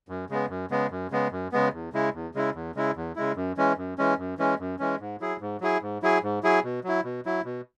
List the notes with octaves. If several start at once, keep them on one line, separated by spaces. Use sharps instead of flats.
F#2
C#3 G#3 B3
F#2
C#3 G#3 B3
F#2
C#3 G#3 B3
F#2
C#3 G#3 B3
E2
C#3 G#3 E4
E2
C#3 G#3 E4
E2
C#3 G#3 E4
E2
C#3 G#3 E4
F#2
E3 G#3 C#4
F#2
E3 G#3 C#4
F#2
E3 G#3 C#4
F#2
E3 G#3 C#4
G#2
F#3 E4 G#4
G#2
F#3 E4 G#4
G#2
F#3 E4 G#4
G#2
F#3 E4 G#4
B2
F#3 E4
B2
F#3 E4
B2